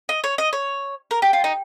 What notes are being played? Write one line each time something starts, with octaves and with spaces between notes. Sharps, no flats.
D#5
C#5
D#5
C#5
A#4
G4
F4
D#4